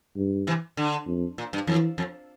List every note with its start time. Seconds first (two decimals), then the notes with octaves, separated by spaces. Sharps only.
0.16 G2
0.47 C3 E3
0.77 D3
1.07 F2
1.38 A#2
1.53 G2
1.67 F2 E3
1.98 F2